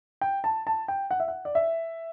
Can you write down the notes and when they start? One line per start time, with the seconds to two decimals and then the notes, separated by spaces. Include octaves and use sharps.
0.21 G5
0.44 A5
0.67 A5
0.88 G5
1.11 F#5
1.20 E5
1.28 F#5
1.45 D5
1.55 E5